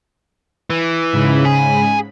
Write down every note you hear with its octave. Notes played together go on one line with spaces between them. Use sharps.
E3
G#2 C#3 B5
G#4